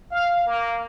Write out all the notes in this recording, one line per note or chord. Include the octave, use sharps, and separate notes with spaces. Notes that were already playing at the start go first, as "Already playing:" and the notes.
F5
A#3